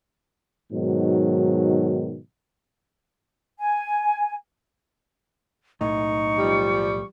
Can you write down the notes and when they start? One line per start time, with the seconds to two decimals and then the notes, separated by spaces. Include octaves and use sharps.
0.72 G#2 B2 D#3 F#3
3.59 G#5
5.81 B1 A2 A3 D#4 C#6
6.37 F3 G3